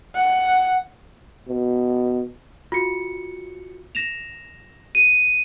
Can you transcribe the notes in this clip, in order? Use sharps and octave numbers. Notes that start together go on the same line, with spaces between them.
F#5
B2
F4 F#4 C#7
A#6 E7 F7
D#7